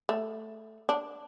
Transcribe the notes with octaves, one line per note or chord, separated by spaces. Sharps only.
A3
D4